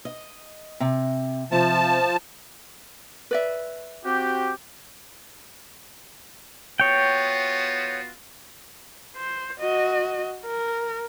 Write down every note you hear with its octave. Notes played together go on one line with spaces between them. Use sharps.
D#5
C3
C3 F3 A5
B4 D5 E5
C4 F#4 G4
B3 F4 F#4 C#5 G5
C5
F#4 D#5
A#4